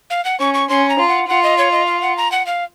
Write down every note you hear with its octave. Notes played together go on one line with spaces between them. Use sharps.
F5
F#5
C#4 C#6
C#6
C#4 C6
A#5
F4
F#5
F4 F#5
D#5
C#5
D#5
F5
F#5
A#5
F#5
F5